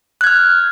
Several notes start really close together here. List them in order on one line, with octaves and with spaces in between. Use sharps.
F#6 G#6 F6